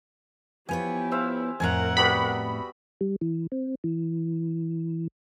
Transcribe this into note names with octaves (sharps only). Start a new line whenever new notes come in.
F3 B3 E4 G4 C#5 G#5
C5 E5 F5
F2 A2 A#4 F#5 G#5 A#5
G3 B3 F#4 B5
G3
E3
C4
E3